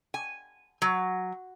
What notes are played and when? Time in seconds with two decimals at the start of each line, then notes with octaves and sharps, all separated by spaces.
0.14 G#5
0.82 F#3